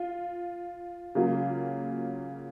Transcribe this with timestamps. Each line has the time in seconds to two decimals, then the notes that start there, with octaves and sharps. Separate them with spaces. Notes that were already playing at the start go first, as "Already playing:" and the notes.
Already playing: F4
1.15 C#3 F#3 A#3 F4